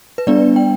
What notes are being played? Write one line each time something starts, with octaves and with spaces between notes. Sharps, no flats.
B4
G3 B3 D4 D5
G5